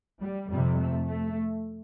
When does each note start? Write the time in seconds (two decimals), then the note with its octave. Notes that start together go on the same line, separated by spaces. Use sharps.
0.20 G3
0.49 F2 C3 G3
0.78 A3
1.08 A3